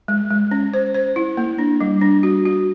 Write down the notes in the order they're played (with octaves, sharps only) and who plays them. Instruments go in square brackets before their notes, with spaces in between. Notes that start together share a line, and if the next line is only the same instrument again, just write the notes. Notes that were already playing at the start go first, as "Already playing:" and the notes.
[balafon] G#3
G#3
C#4
C5
C5
E4
A#3
D4
G3
D4
F#4
F#4